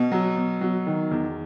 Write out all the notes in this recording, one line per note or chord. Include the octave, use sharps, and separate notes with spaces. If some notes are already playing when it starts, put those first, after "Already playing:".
Already playing: B2
F#3
B2
F#3
D#3
E2